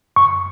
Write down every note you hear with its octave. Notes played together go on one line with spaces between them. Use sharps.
F#2 C#6